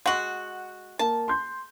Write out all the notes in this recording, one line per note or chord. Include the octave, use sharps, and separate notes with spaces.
G#3 F#4 F#5 F#7
A#3 A5
C6 G6